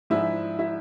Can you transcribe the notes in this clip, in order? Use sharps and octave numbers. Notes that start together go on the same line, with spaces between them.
G#2 F3 G#3 D4 E4 E5
E4 E5